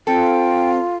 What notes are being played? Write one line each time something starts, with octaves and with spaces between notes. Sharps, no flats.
C4 F4 A4 G5